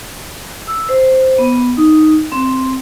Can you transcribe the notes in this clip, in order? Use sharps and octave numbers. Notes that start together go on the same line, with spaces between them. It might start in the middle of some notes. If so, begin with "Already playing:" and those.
E6
C5
B3
D#4
C4